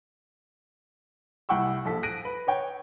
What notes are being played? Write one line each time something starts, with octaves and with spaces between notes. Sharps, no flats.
C2 E4 F#5 G5 C#6 E6
A#1 A4 B6
F#6 A#6 D7 D#7
B4
B4 C#5 G5